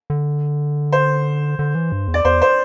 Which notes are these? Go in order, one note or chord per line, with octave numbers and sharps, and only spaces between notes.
D3
C5
D3
E3
G2
E2
D5
E2 C5
C5